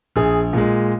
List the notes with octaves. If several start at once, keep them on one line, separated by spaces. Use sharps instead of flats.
A#1 G#4
A#2 G#3